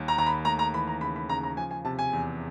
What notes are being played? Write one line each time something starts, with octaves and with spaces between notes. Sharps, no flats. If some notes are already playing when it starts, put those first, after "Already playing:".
Already playing: D#2 D#3 G3
A#5
D#2 A#5
B5
A3 A#5
A#5
E3 B5
A#5
C#3 B5
B5
C#3 A#5
A#5
F3 G#5
G#5
C3 A5
G#5
E2